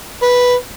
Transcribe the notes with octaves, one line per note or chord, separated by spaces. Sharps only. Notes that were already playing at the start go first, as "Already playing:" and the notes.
B4